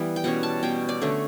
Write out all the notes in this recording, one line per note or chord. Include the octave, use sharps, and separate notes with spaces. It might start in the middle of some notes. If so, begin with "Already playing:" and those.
Already playing: E3 G3 B3
G5
B2 G3 C#4 F#5
A5
B2 G3 C#4 G5
D5
D3 A3 C#4